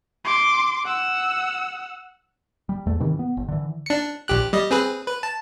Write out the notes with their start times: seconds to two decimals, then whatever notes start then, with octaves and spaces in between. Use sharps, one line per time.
0.25 C6 D6
0.85 F#5 E6
2.69 G3
2.86 E2 A3
3.00 G2 C3 D#3 E3
3.19 B3
3.37 G1
3.48 D3 E3
3.86 D4 C#7
4.28 A#1 G4 F#6
4.53 G3 D#5
4.71 C4 G#4 B4
5.07 B4
5.23 A5